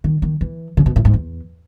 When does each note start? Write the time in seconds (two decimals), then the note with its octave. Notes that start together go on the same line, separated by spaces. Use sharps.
0.04 D#3
0.22 D#3
0.41 E3
0.77 C#3
0.86 B2
0.96 A2
1.05 G#2
1.14 E2